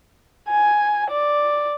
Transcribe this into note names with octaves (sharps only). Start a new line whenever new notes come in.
G#5
D5